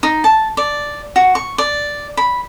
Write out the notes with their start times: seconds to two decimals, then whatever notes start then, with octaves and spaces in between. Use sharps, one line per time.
0.03 D#4
0.24 A5
0.57 D5
1.16 F#4
1.35 C#6
1.58 D5
2.17 B5